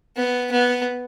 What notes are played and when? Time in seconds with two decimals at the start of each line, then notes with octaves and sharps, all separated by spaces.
0.16 B3
0.52 B3